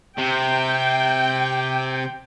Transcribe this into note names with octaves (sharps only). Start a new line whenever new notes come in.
C3 G5